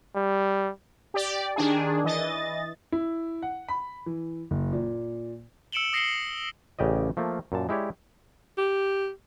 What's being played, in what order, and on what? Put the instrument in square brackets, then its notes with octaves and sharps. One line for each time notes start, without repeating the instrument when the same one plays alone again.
[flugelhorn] G3
[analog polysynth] G4 D5
D#3 D4 G#4
E3 D#5 A6
[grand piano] E4
F#5
B5
E3
F#1
A#2
[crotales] E6 C#7 D7 E7 F#7 G7
D#6 A#6 C7 C#7 F#7 G7
[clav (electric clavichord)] A1 C#3 G4 D5 D#5
F3 A3 A#3
F#2 A#2 A5
G#3 E4 G4 C#5 D5
[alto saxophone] G4